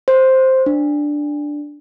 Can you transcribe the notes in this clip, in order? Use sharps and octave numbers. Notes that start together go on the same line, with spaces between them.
C5
D4